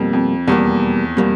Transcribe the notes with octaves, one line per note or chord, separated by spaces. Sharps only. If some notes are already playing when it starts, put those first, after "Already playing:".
Already playing: F2 B2 G3 A#3
F2
E2 B2 G3 A#3
B2 G3 A#3